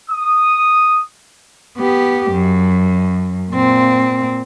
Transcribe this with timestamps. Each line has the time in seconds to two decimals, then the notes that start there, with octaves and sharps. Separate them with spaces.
0.10 D#6
1.78 B3 G4
2.32 F#2
3.52 A#2 C4